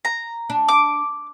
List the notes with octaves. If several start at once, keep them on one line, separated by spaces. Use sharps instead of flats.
A#5
D4
D6